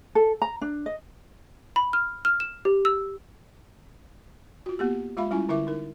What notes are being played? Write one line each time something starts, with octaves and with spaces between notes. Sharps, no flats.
A4
A#5
D4
D#5
B5
F6
F6
E7
G4
E6
F4 F#4
A#3 B3 G4
G#3 F4 E5 F5 B5
G3 C#4 E4 F4 G#5
D3 E4 A#4 E5 D6
D#4 A#4